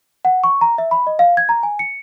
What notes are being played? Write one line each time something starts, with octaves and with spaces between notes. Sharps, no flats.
F#5
C#6
A#5
E5
B5
D#5
F5
G#6
A#5
G#5
C#7